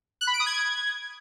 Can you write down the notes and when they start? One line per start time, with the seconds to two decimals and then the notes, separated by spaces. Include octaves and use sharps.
0.21 F#6
0.27 B5
0.34 D7
0.40 D#6
0.46 G#6